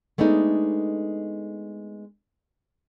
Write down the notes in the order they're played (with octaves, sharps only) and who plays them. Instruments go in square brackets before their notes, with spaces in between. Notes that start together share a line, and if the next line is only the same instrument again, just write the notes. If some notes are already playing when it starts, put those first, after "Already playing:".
[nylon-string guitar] G#3 A3 B3 D4 D#4